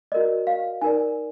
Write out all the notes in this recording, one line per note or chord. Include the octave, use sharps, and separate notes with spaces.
F#4 A#4 D5 D#5
F5
D#4 A#4 D5 G#5